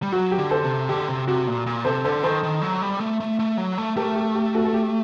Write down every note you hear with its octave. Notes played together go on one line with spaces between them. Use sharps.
G3
F#3 F#4
G4
D3
A4 C5
C3
D3 G4
C3
C3 F#4
A#2
A#2
C3 A4 C5
D3 A4 C5
D#3 A4 C5
D#3
F#3
G3
A3
A3
A3
F#3
A3
A3 G4 A#4
G4
G4
F#4 A4
A4
G4